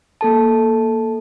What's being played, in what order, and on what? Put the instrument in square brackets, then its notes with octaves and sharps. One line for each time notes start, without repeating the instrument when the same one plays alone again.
[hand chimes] A#3 A4 A5